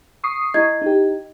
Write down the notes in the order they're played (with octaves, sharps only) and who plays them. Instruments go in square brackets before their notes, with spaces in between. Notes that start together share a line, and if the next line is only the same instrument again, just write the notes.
[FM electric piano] C#6 D#6 C7
[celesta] E4 D#5 G#6
[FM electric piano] D#4 G4